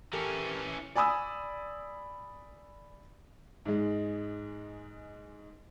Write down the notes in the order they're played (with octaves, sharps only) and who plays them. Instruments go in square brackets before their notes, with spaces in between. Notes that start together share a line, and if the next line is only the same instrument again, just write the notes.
[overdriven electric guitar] E3 C#4 [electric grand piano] G4 A4 A#4
[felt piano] D5 G#5 B5 D#6 E6
[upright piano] G#2 G#3